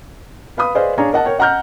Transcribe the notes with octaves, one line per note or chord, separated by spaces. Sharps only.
B4 F5 B5 D#6
G#4 B4 C5 D5 D#5 F5
D4 G#4 C#5 D5 F5 A#5
A#4 D#5 F#5 A5
A#4 C#5 G5
D#5 F#5 A#5 F6 G6